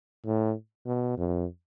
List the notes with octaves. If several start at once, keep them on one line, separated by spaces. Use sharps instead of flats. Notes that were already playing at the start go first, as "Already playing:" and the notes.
A2
B2
F2